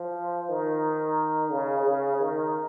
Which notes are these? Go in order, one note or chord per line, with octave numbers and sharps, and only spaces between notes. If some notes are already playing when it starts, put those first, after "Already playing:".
Already playing: F3
D#3
C#3
C#3
D#3